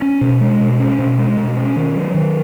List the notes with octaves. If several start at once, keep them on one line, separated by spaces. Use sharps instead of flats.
C#4
B2
G#3
B2
C#4
B2
G#3
B2
C#4
D#3
F#3
D#3